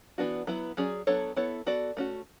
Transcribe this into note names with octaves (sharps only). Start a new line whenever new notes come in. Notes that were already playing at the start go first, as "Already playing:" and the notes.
E3 B3 D4 F#4
F#3 B3 E4 B4
F#3 C#4 G#4 D5
F#3 B3 D4 A4 C#5
B3 E4 A4 C#5
B3 F#4 A4 D5
A3 C#4 F#4